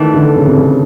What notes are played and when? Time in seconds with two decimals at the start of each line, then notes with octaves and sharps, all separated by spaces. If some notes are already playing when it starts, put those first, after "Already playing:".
Already playing: D#3 E3 A3 D4
0.14 D3
0.36 C#3
0.47 C3
0.58 C#3